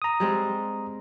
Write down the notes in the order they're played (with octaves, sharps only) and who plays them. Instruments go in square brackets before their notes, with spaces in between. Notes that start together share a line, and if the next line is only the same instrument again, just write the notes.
[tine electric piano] A#5 D#6
[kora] G3 G#3 C4